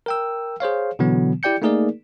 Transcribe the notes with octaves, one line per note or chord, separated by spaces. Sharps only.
A#4 G5 E6
G#4 C5 C#5 F5
B2 D3 E3 F#3 B3
E4 G4 D5 G5 G6 C#7
A3 A#3 D#4 G#4 A#4 D5